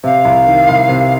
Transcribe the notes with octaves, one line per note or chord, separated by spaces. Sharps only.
C3 F5
C2
D#3
C2
C3